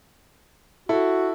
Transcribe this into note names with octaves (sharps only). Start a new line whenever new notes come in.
E4 F#4 A4